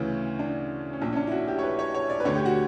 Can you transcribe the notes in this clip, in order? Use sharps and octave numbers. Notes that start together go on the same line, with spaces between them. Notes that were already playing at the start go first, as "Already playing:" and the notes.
Already playing: D2 C#3 E3 C#4
D4
C#4
A#1 A#2 D4
C#4
D4
E4
F#4
G4
C#5
B4
C#5
C#5
D5
B4
D2 D3 C#5
G4
F#4